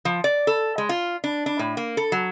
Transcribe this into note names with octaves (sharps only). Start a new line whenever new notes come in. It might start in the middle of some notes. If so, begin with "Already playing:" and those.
F3
D5
A4
G#3
F4
D4
D4
A2
A#3
A4
F#3